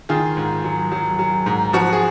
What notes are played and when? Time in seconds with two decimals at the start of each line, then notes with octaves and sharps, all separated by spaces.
0.09 D#3 F4 G#4
0.37 G#2
0.64 F#3
0.91 F#3
1.19 F#3
1.46 G#2
1.73 F3 F#4
1.93 G#4